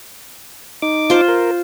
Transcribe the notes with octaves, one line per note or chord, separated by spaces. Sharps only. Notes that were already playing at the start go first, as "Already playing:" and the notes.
D#4 D6
F4 C5
A#4